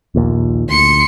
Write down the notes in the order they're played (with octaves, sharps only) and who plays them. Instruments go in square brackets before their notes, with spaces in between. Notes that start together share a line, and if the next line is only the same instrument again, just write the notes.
[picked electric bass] A#1 D#2 A#2
[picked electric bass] D2 [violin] C6 C#7